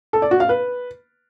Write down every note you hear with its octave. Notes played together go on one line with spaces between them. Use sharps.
A4
D5
F#4
F5
B4